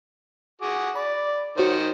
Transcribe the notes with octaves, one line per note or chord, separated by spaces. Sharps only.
F#4 G#4 D6
D5 B5
D#3 F#4 C5 C#5